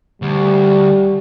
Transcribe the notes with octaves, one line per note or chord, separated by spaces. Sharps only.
D2 G3